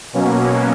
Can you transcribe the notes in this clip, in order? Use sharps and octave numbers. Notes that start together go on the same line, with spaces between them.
B2 F#3 A#3 C#4